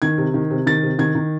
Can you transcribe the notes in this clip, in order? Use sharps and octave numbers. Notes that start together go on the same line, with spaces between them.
D#3 G#6
C3
D#3
C3
D#3 A6
C3
D#3 G#6
D#3